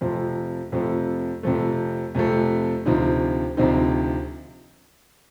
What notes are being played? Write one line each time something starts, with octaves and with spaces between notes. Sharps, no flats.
F2 C3 F3 A3
F2 C3 F3 A3
F2 C3 F3 A3
F2 C3 F3 A3
D2 C3 F3 C4 D#4
D2 C3 F3 C4 D#4